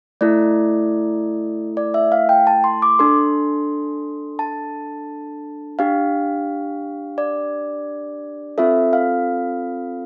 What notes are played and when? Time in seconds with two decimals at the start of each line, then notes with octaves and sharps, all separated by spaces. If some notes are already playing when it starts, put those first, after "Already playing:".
0.21 A3 E4 A4 D5
1.77 D5
1.94 E5
2.12 F5
2.29 G5
2.47 A5
2.64 C6
2.82 D6
2.99 D4 A4 C6
4.39 A5
5.79 D4 G4 F5
7.18 D5
8.58 C4 F4 A4 E5
8.93 F5